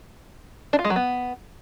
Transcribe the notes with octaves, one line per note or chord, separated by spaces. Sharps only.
D4
F4
G#3
F#3
B3